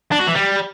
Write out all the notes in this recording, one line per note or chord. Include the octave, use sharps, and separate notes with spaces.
D4
F#4
E3
G3